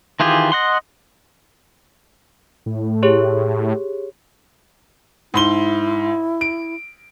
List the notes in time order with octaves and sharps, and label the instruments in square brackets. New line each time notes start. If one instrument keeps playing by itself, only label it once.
[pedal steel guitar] D#3 E3 F4 G4 G#4
D#5 F#5 C6
[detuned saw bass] A2
[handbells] G4 G#4 C#5
[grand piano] G#2 C6 G7 [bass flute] E4
[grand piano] D7